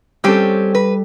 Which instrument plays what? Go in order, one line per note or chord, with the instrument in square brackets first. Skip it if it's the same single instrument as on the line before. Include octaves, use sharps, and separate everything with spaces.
[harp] G3 A4 [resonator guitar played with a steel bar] C4 C#4 G4
[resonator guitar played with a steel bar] B4